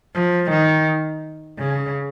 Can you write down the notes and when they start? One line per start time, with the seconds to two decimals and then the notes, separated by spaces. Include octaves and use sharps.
0.14 F3
0.50 D#3
1.58 C#3